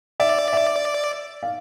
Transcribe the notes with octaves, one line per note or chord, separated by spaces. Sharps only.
D5 E5
E5
F5